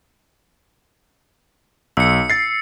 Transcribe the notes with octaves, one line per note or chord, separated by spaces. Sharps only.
B1 E6 C#7
A6 C7